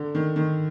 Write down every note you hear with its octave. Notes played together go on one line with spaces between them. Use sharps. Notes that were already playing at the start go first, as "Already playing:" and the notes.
Already playing: D3
D#3
D#3